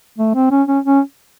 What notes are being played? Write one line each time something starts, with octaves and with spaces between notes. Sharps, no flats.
A3
C4
C#4
C#4
C#4